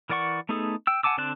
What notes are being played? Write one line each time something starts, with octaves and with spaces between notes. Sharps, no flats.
E3 A#4 D5 F#5 C#6
A3 B3 D#4 G#4 A4
G5 E6
F#5 G#5 A5 D6 E6
D3 C4 D4 A5 F#6